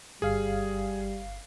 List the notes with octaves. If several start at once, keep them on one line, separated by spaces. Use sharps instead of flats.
G1 G3 G#4 F5 C7